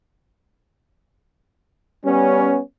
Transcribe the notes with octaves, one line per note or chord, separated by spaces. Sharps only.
G3 B3 C#4